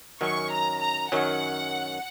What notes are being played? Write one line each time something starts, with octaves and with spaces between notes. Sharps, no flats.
F#2 D#3 F#3 C#4 C#6
A#5
A#5
F#2 D#3 F#3 C#4 F#5